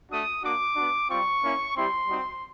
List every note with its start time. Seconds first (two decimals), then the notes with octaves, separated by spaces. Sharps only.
0.10 A3 D4 F#4 D#6
0.43 A#3 D4 F#4 D6
0.76 B3 D4 F#4
1.09 G3 C4 F4 C#6
1.42 A#3 C#4 E4
1.75 G3 C4 E4 G4 C6
2.08 G3 C4 D#4 F#4